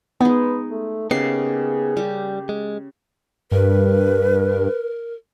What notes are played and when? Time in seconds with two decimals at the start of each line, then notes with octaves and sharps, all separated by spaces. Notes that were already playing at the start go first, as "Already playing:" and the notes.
0.21 G#3 B3 D#4 B4
0.70 A3
1.11 C#3 A#3 B3 D#4 G4 G#4 C7
1.97 G3 G4
2.49 G#3
3.51 G2 A#4 B4